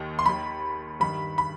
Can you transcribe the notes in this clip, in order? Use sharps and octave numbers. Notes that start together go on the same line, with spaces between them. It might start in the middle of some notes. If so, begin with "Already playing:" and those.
Already playing: D#2 D#3
C6
D#2 D#3 B5
G2 D#3 B5
B5